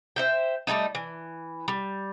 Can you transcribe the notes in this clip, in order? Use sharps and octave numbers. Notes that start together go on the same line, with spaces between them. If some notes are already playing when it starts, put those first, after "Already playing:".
C5 E5 G5
G3 A3 A#3 D#4
E3
G3